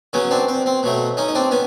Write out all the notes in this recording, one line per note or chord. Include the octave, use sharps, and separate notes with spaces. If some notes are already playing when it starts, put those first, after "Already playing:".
C#3 F#3 B3 C#4
C4 D4
C4
C4
B2 F#3 A3
C#4 D#4
D#4
C4 D4
B3 C#4